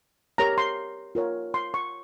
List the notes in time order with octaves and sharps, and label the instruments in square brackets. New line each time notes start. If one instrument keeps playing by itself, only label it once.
[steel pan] G4 A#4 C#5 A#5
C6
F4 A#4 C#5
C6
C#6